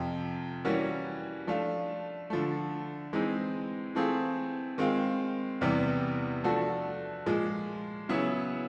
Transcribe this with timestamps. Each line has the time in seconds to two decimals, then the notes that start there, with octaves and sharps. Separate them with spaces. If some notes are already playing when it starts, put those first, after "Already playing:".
Already playing: F2 C3 F3
0.65 E3 G3 A#3 C#4 F#4
1.47 F3 A3 D4 F4
2.30 D3 F3 A3
3.13 E3 G#3 C4 D#4
3.95 E3 A3 C4 F4 G#4
4.78 D#3 G#3 C4 F4
5.61 E2 C3 E3 G3 B3
6.44 F3 A3 D4 F#4 A4
7.26 A#2 F3 G#3
8.09 C#3 F#3 B3 E4 G#4